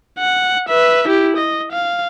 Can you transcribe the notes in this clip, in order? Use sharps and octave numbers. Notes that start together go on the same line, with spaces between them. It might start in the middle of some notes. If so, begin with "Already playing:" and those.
F#5
B4 E5
E4 G4
D#5
F5